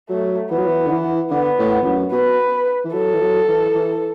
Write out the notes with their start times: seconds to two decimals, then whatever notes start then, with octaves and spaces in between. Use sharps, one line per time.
0.10 F#3 A3
0.51 E3 B3
0.58 F#3
0.67 E3
0.87 D3
0.92 E3
1.31 D3 B3
1.59 A2
1.82 E2
1.86 F#2
2.12 B2 B4
2.85 E3
2.93 F#3 A4
3.14 E3
3.21 F#3
3.48 E3
3.75 E3